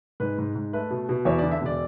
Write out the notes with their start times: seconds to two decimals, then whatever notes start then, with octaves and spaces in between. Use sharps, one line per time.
0.20 G#2 B4
0.38 G#2
0.55 G#2
0.73 A3 B4
0.90 B2
1.09 B2
1.25 E2 C#5
1.38 D5
1.43 D3
1.51 E5
1.61 E1
1.66 D5